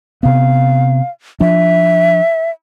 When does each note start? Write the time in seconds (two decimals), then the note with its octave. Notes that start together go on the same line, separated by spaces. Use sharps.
0.23 C3 B3 F5
1.40 F3 D4 E5